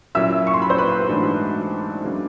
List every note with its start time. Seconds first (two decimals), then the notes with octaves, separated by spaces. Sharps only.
0.15 A#2 F#3 A#3 C#4 E4 E5 E6
0.47 C#6
0.54 C6
0.62 B5
0.70 C5 C6
0.78 B4 B5
1.09 G#2 E3 A3 D4 F#4
2.04 C#3 F#3 A#3 D4